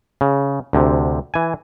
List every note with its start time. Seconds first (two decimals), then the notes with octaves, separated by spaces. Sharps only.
0.21 C#3
0.73 D2 C3
1.34 E3 G#5